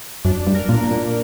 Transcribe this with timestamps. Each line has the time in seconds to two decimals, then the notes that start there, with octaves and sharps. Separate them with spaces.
0.25 F#2 D4
0.47 G2
0.54 A#4
0.69 A#2
0.83 A#3
0.91 A#2